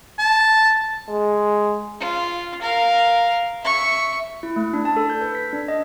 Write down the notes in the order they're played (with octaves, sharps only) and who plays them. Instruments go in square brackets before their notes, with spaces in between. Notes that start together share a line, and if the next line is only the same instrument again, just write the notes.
[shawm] A5
[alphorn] G#3
[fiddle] F4
A#4 F5
E5 C#6
[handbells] E4
A3
D4
A5
A4
G6
B4
B6
D4
D#5